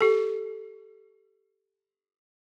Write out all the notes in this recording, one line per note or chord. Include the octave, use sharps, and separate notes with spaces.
G4 A4